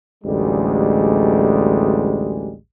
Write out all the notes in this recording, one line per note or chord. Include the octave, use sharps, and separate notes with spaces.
A1 D2 G3 G#3